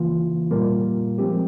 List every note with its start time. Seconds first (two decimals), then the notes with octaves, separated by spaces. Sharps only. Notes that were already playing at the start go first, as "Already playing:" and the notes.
Already playing: C#3 E3 A#3 F4
0.51 A#2 G3 A#3 F4 A#4
1.18 F3 G#3 C4 G4